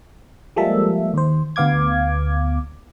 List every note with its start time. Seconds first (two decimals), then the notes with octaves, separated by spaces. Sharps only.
0.56 F3 G3 G#3 A#3 A4 E5
1.14 D#2 C5
1.56 D2 B3 F5 D6 G#6